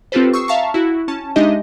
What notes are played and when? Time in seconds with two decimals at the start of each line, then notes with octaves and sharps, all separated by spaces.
0.12 C4 F4 G4 A4 B4 C5
0.33 C#6 D#6 E6 C7
0.48 E5 F5 A5 A#5 C#6
0.74 E4 F#4
1.08 C#4 A5
1.36 G#3 D4 D#4 G4 D#5 E5